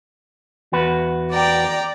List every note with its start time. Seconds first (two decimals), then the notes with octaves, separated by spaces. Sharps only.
0.73 E2 F#4 B4
1.31 D5 G5 A#5